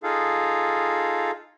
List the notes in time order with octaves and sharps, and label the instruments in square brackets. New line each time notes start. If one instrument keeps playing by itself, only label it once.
[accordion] D#4 F4 G#4 A4 F5